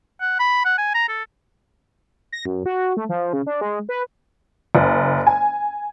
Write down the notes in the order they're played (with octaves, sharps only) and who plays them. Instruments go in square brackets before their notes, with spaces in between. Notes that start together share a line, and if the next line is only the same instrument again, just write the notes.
[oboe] F#5
B5
F#5
G#5
A#5
A4
[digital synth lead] A#6
F#2
F#4
A3
F3
C#3
D4
G#3
B4
[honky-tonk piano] F#1
G#5